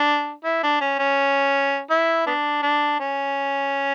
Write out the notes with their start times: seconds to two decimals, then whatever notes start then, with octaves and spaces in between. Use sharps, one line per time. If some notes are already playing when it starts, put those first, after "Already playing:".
Already playing: D4
0.44 E4
0.63 D4
0.81 C#4
0.99 C#4
1.90 E4
2.27 B3 D4
2.63 D4
3.00 C#4